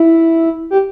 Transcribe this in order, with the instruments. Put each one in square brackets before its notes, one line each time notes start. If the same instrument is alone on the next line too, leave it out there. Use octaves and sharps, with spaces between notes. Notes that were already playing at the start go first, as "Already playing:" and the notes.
Already playing: [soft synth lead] E4
G4